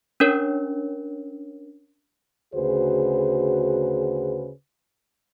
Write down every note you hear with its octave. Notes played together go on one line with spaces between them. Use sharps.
C#4 D4 A#4 C#5
D2 C#3 F#4 G#4 B4 C5